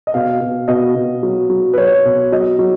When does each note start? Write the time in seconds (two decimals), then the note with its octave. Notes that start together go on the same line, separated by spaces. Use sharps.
0.07 D#5
0.14 B2 F5
0.41 B2
0.68 B2 D#5
0.95 B2
1.23 F#3
1.49 F#3
1.73 B4
1.77 F#3 C#5
2.05 B2
2.32 F#3 D#5
2.59 F#3